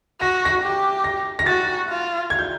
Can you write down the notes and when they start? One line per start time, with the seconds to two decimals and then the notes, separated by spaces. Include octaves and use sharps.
0.20 F#4 A#6
0.45 A#6
0.62 G4
1.04 A#6
1.39 A#6
1.46 F#4 A6
1.89 F4
2.30 G#6
2.39 G6